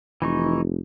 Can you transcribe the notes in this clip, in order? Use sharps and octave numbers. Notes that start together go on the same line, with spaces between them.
F1 E3 D#4 C#6